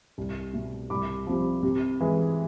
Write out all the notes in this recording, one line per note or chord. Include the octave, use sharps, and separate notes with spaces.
C2
B2 A3
C2 B5 D6
C3 F3
C3
E3 G#3